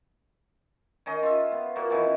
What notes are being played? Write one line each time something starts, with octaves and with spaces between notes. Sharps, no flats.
D#3 C#4 D#5
F4 E5
B3
A#2 A#3 F#4
D#3 E3 B3 C#4